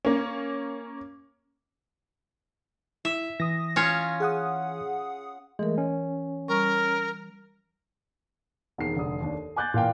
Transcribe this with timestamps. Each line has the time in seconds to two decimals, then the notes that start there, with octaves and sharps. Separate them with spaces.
0.05 A#3 C#4
3.05 E4 E5
3.40 E3 D#6 A#6
3.76 C#4 F4 C#5
4.20 G#4 F#5 D#6
5.59 E3 G#3 A3 A#4
5.78 C#4
6.48 G3 A#4 C#6
8.78 E1 D#2 D#3 C7
8.96 F1 D3 D#6
9.21 D#2 D4
9.33 A4
9.56 G#5 D6 F#6 G6 A6
9.74 A#2 E3 F5 G5